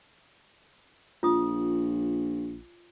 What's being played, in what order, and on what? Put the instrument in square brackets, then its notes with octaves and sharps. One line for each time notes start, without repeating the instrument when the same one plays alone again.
[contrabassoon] A#1 [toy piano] F4 D#6